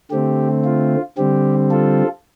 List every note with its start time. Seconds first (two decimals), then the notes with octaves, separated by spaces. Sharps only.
0.11 D3 A3 C4 G4
0.65 F4
1.17 D3 G3 C4 G4
1.71 F4 A4